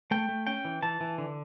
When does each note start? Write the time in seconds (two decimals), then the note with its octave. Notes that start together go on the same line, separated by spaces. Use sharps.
0.11 A3 G5
0.29 A3
0.47 C#4 G5
0.65 E3
0.83 E3 A5
1.01 E3
1.18 D3